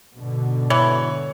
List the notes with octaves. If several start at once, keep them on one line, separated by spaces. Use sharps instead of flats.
G#2 B2 D3
E3 C#5